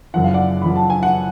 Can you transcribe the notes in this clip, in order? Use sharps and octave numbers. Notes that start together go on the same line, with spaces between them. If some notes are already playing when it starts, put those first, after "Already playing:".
F#1 F#2 F3 F#5
F5
D5 F#5
F#1 F#2 F3 B5
A5
G#5
F#5